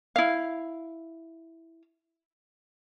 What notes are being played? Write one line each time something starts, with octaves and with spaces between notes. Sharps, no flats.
E4 F5